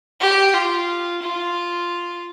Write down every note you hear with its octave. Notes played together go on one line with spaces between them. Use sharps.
G4
F4
F4